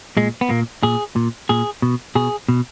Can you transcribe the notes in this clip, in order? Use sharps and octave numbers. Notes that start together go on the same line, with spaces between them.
A#2 G#3
B3
A#2 A#3
A#2 G#4
A#2
A#2 G#4
B2
B2 G#4
B2